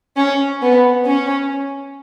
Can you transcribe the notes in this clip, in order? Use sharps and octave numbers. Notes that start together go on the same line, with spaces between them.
C#4
B3
C#4